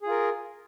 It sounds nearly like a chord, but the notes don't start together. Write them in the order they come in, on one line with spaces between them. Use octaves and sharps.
G#4 F4 A#4